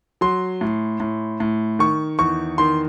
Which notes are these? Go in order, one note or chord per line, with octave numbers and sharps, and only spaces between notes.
F#3 C6
A2
A2
A2
D#3 C#6
E2 C#6
D#3 C6